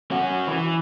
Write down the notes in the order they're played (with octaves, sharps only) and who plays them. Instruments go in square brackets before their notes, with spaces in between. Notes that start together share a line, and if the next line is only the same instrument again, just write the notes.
[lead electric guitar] C#4 F#4
E3